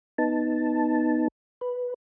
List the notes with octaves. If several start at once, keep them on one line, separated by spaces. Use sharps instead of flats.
B3 D#4 A5
B4